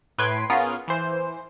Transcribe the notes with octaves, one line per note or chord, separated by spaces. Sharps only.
A2 B4 C6 G#6 C7 D7
B3 C#4 F4 G#4 A#4
E3 C5